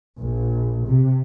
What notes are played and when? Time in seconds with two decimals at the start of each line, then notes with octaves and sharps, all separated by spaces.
0.19 A#1
0.88 C3